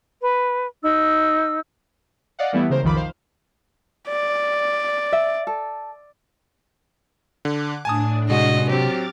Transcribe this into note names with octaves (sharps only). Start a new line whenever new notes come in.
B4
D#4 E6
D5 D#5 F5 F#5
E3 G3 A3 B3 E4
C#3 G#3 A#4 C5
B1 F2 D#3 F3 B5 D6
C5 F5
D5
E5
A4
D3 D6 F#6
A2 D4 G#5 A5 D#6
C3 G#3 F#4 D#5
F#3 C4 G4 D6 F6 A6